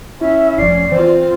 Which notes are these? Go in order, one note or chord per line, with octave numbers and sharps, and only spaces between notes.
C#4 E4 E5
F1 F3 D5 C7
E3 C4 F4 C5